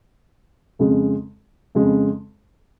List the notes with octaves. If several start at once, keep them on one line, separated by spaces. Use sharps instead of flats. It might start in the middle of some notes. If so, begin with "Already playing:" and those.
F2 C#3 G#3
F2 C#3 G#3